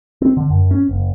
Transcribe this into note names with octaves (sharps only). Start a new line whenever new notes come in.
C4
D3
F#2
C#4
F#1